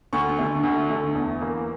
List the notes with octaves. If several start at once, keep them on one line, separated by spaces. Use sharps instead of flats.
D2 C#6
D3 A3
D2
D3 A3
E2
E3 A#3